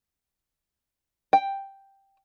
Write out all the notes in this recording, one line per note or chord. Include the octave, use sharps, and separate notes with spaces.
G5